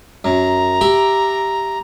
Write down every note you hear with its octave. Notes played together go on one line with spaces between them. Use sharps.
F#2 A#5
G4 E5 B5